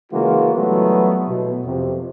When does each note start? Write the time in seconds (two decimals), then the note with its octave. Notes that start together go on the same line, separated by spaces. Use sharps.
0.12 C#3 E3 G#3 A#3 F4 F#4
0.55 E3 F#3 G3 A3 B3
1.28 B2
1.65 F2 C3